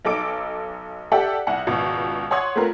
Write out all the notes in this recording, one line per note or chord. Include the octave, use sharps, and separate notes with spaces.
B1 D#4 A4 D6 D7
G4 A4 D5 E5 F#5 G5
C2 F#5 C#7
G#1 C#2 B2
C#5 F#5 C6 D#6 G#6
A3 C4 F4 A#4 B4